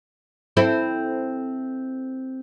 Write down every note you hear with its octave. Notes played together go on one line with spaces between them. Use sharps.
C4 E4 A4